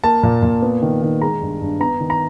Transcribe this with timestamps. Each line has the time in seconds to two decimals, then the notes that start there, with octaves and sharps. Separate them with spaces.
0.04 A#3 A5
0.23 A#2
0.42 A#2
0.62 B3
0.82 D#3
1.02 D#3
1.21 G#3 A#5
1.41 G2
1.61 G2
1.80 B3 A#5
2.00 D#3
2.10 A#5